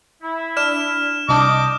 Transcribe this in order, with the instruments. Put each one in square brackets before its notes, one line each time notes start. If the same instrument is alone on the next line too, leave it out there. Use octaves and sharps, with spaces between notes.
[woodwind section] E4
[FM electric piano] D4 [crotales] F6 E7
[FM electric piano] C2 D4 G6 [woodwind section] D#5 [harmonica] D6